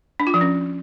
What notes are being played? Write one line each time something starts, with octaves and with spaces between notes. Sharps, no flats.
D4
F4
F3
C#4